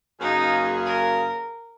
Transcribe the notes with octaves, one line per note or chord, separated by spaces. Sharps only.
F#2 C#3 A#3 C#4 D#4 G#4
A#4